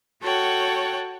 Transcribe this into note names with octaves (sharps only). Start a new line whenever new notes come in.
F#4 A4 C#5 F#5 G5